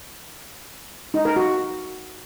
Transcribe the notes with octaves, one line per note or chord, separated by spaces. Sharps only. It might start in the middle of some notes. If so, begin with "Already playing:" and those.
D#4
A#4
F#4